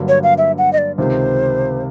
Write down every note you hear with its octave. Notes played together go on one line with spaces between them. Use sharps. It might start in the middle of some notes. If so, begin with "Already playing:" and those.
Already playing: G2 D3 F#3 A#3
C#5
F5
E5
F#5
D#5
D5
C#2 C3 D#3 C5